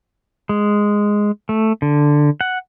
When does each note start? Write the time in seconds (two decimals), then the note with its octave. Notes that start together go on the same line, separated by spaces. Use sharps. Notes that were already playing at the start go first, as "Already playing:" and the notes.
0.49 G#3
1.49 A3
1.82 D3
2.41 F#5